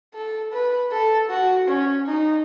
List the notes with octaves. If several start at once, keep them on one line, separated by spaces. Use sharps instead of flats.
A4
B4
A4
F#4
C#4
D#4